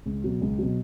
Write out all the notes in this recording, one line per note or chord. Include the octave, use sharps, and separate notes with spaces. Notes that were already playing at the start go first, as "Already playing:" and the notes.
C#2
B2 F#3
C#2
B2 F#3